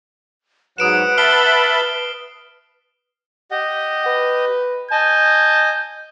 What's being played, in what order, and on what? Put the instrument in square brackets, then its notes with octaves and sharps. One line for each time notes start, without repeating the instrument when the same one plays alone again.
[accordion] G#2 F#3 [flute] B4 [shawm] F#5 [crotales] D#6 D7 E7
[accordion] E5 A5 B5 [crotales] F6 C7 G7
[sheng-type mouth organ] G4 D#5 [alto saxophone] F#5
[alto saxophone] B4
[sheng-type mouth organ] D#5 G#5 [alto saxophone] A5 [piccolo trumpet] G6